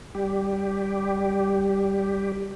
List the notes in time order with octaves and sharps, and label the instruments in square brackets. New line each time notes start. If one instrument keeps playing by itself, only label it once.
[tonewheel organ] G3 G4